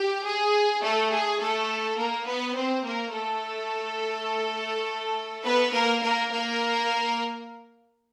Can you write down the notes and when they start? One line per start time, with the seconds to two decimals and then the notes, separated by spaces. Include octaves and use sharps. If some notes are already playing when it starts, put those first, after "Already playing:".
Already playing: G4
0.24 G#4
0.83 A3 A4
1.11 G#4
1.40 A3 A4
1.98 A#3 A#4
2.27 B3 B4
2.56 C4 C5
2.85 A#3 A#4
3.13 A3 A4
5.45 B3 B4
5.73 A#3 A#4
6.02 A#3 A#4
6.32 A#3 A#4